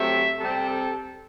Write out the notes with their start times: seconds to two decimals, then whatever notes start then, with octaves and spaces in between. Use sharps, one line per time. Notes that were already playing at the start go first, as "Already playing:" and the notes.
Already playing: C3 F#3 A3 C4 E5
0.39 C3 G3 C4 A4
0.70 A4